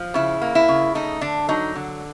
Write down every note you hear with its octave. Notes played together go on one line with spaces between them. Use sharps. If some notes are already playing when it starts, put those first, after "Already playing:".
Already playing: F3
C#3 E4
A#3
E4
C#3
A3 D#4
D3 D4
F#3 D#4
D3